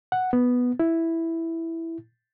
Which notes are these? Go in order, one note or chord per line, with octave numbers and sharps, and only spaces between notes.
F#5
B3
E4